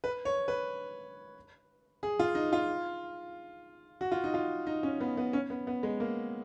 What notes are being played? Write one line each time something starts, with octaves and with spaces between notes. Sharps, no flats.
B4
C#5
B4
G#4
F4
D#4
F4
F#4
F4
D#4
F4
D#4
C#4
B3
B3
C#4
B3
B3
G#3
A#3